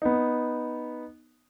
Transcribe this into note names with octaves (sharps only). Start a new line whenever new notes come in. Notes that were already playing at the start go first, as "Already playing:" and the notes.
B3 D#4